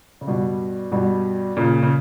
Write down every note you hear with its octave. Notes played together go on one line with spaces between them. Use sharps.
C#3
G2 B2
G2 B2
A#2 C#3
C#3